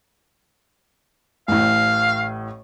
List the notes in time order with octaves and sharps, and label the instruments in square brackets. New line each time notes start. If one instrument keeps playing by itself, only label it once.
[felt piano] A1 A2 [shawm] F5